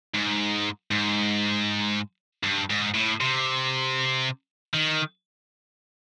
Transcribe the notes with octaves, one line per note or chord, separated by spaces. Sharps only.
G#2
G#2
G2
G#2
A2
C3
D#3